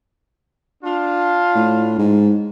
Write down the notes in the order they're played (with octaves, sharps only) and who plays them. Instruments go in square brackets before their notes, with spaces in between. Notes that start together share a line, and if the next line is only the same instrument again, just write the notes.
[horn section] D4 F4
[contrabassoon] A2
G#2